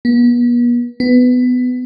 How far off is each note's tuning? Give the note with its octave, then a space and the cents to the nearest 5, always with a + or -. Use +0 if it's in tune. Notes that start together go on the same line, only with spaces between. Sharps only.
B3 -40
B3 +15